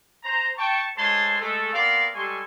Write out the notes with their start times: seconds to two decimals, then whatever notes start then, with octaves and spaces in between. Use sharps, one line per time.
0.23 C5 A#5
0.57 G5 A5 C#6
0.96 G#3 A3 C5 C#5 A5 C6
1.40 G#3 A3 A4
1.72 B3 C4 A#4 D5 F5 C6
2.14 G3 G#3 A4 G#5 C6 C#6